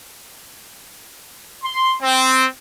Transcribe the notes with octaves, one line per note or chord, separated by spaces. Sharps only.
C6
C4